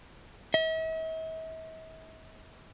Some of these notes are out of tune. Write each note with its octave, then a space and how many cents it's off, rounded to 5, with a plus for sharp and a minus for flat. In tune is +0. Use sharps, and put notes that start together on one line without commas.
E5 -45